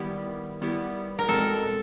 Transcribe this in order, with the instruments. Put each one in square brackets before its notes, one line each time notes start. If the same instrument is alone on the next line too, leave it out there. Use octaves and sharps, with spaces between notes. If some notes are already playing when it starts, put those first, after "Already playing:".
Already playing: [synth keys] D#3 G3 B3 E4 G4
D#3 G3 B3 E4 G4
[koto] A#4
[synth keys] E2 B2 G#3 C4 [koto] A4